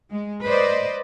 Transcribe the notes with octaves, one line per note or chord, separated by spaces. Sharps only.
G#3
B4 C5 D5 D#5